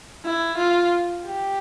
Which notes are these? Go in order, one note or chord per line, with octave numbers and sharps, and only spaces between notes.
E4
F4
G4